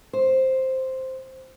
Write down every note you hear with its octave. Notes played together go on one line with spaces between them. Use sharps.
C5